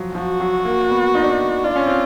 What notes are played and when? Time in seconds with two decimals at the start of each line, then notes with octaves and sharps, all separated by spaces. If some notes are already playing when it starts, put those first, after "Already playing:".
Already playing: F3 F#3
0.15 F3 F#4
0.40 F#3
0.65 A#3
0.90 B3
1.15 D#4
1.23 D4
1.29 D#4
1.64 D4 F4
1.76 C#4
1.86 C4